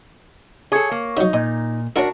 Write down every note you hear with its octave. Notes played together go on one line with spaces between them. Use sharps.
G#4 A4 C#5
A#3
C#3 F#3 D#4
A#2 D#5
C#4 D4 E4 F#4 A#4